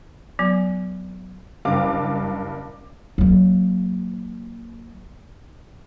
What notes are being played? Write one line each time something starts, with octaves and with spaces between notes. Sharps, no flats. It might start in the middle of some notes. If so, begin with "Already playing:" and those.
F#3 B3
F#1 G2 F5 D6
F#3 A#3